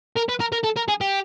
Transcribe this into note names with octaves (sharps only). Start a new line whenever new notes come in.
A#4
B4
A#4
A#4
A4
A#4
G#4
G4